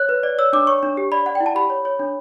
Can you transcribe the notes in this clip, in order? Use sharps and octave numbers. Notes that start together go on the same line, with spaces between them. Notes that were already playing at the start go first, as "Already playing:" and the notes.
Already playing: C#5 F#6
B4
D5
C#5 E6
D4 D6
C#5 C#6
D4
G4
D5 B5
D5 F#5
G5
E4
A5
G4 B5
C#5
C#5
D4